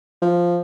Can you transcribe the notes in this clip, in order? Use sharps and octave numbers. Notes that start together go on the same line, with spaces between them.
F3